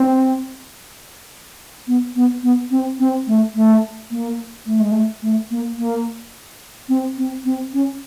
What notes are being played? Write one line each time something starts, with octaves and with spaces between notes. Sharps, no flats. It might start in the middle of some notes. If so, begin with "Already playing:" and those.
Already playing: C4
B3
B3
B3
C4
C4
A3
A3
A#3
A3
G#3
A3
A3
A#3
A#3
C4
C4
C4
C#4